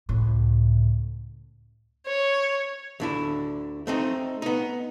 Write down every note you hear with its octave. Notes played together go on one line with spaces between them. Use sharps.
C#2 A2
C#5
D2 D3 E4
A3 C4 D#4
B3 D#4